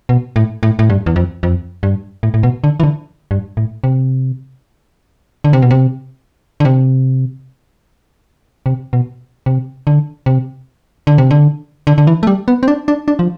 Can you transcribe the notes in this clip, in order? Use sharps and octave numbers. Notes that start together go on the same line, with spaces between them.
B2
A2
A2
A2
G2
E2
F2
F2
G2
A2
A2
B2
D3
E3
D3
G2
A2
C3
D3
C3
B2
C3
D3
C3
C3
B2
C3
D3
C3
D3
C3
D3
D3
D3
E3
A3
G3
B3
C4
D4
D4
D4
F3